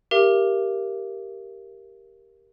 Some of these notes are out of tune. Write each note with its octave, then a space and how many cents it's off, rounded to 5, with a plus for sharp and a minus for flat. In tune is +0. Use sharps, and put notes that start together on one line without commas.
G4 +0 A#4 +0 E5 +45